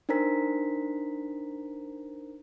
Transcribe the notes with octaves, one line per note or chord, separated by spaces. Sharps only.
D4 D#4 A#4 C5 A#5 B6